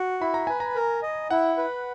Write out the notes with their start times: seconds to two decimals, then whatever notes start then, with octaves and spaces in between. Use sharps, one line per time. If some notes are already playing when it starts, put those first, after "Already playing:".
Already playing: F#4
0.21 E4 B5
0.34 A#5
0.47 B4 G#5
0.60 A#5
0.75 A#4
1.02 D#5
1.30 E4 F#5
1.57 B4